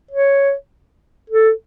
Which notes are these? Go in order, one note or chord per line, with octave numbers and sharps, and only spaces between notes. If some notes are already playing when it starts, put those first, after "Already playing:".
C#5
A4